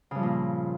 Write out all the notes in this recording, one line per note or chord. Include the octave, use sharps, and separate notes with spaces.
G2 A#2 C#3 F3